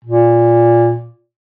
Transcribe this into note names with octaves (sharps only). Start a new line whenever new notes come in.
A#2